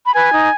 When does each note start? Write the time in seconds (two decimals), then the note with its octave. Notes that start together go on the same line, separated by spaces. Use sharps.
0.07 B5
0.15 B4 G#5
0.33 D#4